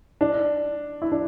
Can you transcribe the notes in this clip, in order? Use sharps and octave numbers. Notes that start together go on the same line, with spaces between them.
D4
E4
D4